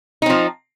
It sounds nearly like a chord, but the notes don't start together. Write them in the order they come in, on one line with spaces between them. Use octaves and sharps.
D#4 C4 F3